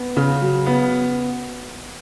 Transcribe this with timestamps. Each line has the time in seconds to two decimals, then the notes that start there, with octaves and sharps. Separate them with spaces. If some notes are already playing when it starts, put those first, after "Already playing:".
Already playing: B3
0.16 C#3
0.41 F#3
0.66 B3